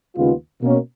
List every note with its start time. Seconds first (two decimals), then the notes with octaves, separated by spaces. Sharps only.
0.16 D#2 C#3 G#3 B3 F4
0.61 B2 A#3 C#4